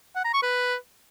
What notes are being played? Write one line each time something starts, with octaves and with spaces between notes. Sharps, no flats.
F#5
A#5
C#6
B4